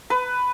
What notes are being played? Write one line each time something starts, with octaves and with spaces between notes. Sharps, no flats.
B4